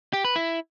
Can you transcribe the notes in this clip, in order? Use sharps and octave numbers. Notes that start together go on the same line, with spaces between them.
G4
B4
E4